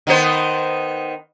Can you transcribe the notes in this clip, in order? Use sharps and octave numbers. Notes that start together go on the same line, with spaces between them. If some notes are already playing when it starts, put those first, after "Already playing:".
D#3 B3 C5